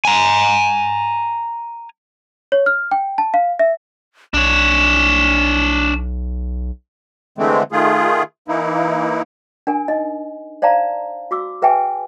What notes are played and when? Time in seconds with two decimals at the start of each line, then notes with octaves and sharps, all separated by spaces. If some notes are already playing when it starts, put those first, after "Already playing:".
0.05 G#5 A#5
2.52 C#5
2.66 F6
2.91 G5
3.18 A5
3.34 F5
3.59 E5
4.34 B1 D4 C#5 E7
7.38 D3 E3 G#3 A3 C4
7.72 D#3 A3 F4 G#4
8.48 E3 A#3 D#4 E4
9.67 D4 A#4 G#5
9.88 D#4 D#5
10.62 C5 D5 F5 A5 A#5
11.31 F#4 D6 E6
11.62 G#4 B4 E5 G5 G#5